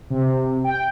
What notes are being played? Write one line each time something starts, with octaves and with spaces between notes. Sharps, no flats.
C3
G5